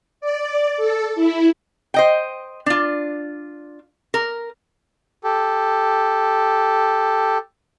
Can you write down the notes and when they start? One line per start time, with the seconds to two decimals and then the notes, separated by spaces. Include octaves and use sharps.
0.21 D5
0.77 A4
1.15 E4
1.94 C5 D#5 G5
2.66 D4 F4
4.14 A#4
5.24 G4 A4